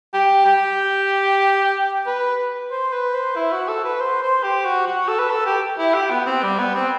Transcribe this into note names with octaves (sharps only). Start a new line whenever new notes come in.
G4
G4
B4
C5
B4
C5
E4
F#4
A4
B4
C5
C5
G4
F#4
F#4
A4
B4
A4
G4
E4
G4
B3
C4
G3
B3
C4